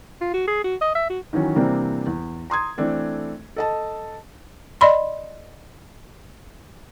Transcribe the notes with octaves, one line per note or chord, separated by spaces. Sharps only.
F4
F#4
G#4
F#4
D#5
E5
F#4
D#3 E3 F#3 C#4
C3 E3 G3 A#3 C4 D4
E2
A#5 C6 D#6 G#6
E3 A3 C4 D4 A4
A4 D#5 A5
D5 D#5 B5 C6